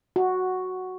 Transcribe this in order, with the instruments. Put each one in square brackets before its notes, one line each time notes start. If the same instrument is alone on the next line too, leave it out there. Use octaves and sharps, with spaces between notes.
[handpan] F#4